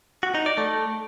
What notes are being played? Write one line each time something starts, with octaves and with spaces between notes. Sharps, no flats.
F#4
D#4
D5
A3